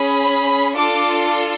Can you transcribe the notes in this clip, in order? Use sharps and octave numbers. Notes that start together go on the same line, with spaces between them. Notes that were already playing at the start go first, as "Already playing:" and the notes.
Already playing: C#4 G#4 B5
D4 F4 A4 D6